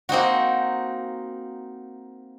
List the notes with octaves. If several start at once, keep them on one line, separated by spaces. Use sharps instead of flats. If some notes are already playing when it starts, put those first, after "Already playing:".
A#3 C4 D#4 F#4